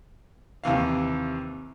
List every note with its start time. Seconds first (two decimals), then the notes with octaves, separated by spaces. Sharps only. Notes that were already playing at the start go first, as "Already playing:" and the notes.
0.64 D#2 C3 E3 F5